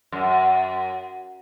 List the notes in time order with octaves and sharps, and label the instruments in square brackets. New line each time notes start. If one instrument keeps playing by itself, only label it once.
[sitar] F#2